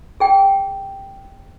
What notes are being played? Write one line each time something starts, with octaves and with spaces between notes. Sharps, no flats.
G#4 G5